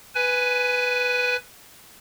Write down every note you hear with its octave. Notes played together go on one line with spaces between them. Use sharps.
B4 G#5